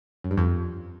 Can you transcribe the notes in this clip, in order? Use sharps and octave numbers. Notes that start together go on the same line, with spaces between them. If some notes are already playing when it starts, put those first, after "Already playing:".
F#2
G2
F2